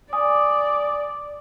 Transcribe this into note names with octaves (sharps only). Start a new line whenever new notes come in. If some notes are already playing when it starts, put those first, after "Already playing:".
D5 G#5 D#6